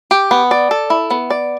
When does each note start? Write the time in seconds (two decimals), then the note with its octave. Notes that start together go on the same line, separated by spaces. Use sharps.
0.11 G4
0.31 B3
0.51 D5
0.71 A4
0.90 E4
1.10 B3
1.30 D5